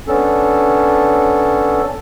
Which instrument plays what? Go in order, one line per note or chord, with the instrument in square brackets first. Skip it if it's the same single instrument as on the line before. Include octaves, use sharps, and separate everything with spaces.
[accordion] B3 C#4 D4 A4